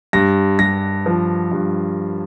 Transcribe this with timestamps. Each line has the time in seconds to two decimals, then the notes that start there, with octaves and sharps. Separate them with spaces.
0.13 G2 A#6
0.59 G2 A#6
1.06 F3
1.52 G2